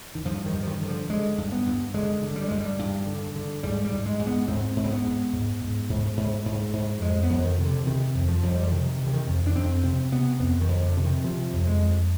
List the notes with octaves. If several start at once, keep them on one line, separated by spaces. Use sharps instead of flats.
D#3
G2 F3
D#3
G2
F3
D#3
D3
F3
D3 G#3
G2
B3
G2
D3 G#3
D3
G3
G2 G#3
G3
G2
D3
D3
G#2 G3
G3
G#2
G#3
G#2
B3
G#2 C4
G#2
C4
B3
G#2
G#2
G#2
G#2
G#2
G#2
G#2
F2 G#3
B3
F2
D#3
C3
D3
C3 D#3
F2
F3
F2
G3
F3
C3 D#3
C3
D3
D#3
F2
D4
F2 C4
C3 C4
C3 B3
F2 B3
D#3
F2
D3
C3
D#3
C3 F3
F2
G#3
F2